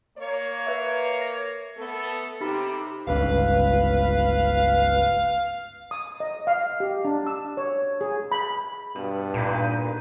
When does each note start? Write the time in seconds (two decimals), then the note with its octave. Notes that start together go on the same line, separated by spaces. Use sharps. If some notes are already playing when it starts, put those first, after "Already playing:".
0.18 A#3 C#5
0.67 B4 E5
1.21 A#6
1.77 A3 B3 A4
2.40 C3 D#4 G4 B5
3.07 G1 C#2 B4 F5
5.91 D#6
6.20 D#5
6.47 F5
6.80 G4
7.05 D4
7.27 E6
7.57 C#5
8.01 G#4
8.32 B5
8.96 G2 B2
9.34 A#2 D3 D#4 B4